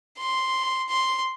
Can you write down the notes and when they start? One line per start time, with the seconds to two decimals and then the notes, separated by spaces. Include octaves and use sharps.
0.19 C6
0.89 C6